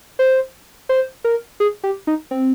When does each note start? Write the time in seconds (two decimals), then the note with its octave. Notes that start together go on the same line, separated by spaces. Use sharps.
0.19 C5
0.89 C5
1.24 A#4
1.60 G#4
1.83 G4
2.07 D#4
2.31 C4